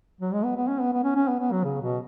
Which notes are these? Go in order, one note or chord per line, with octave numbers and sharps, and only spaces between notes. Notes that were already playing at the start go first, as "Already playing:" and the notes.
F#3
G#3
B3
B3
C#4
B3
B3
C#4
C#4
B3
B3
F#3
C#3
B2